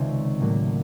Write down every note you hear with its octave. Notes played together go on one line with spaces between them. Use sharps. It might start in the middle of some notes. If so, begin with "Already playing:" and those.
Already playing: C#2 C3 D#3 G#3 C4 D5
A2 F#3 A#3